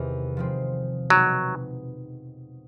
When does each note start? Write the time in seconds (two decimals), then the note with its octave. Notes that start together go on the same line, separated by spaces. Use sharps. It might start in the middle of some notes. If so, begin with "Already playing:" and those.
Already playing: E2 C3 D#3
0.37 F3 G#3 C4
1.10 B2 F#3 G#3 C4 D#4